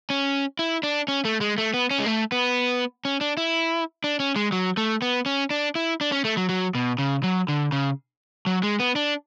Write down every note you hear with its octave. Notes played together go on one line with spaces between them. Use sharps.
C#4
E4
D4
C#4
A3
G#3
A3
B3
C#4
G#3
A3
B3
C#4
D4
E4
D4
C#4
G#3
F#3
A3
B3
C#4
D4
E4
D4
C#4
A3
F#3
F#3
B2
C#3
F#3
D3
C#3
F#3
G#3
B3
D4